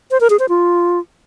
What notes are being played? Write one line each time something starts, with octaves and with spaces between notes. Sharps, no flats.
C5
A#4
G#4
C5
F4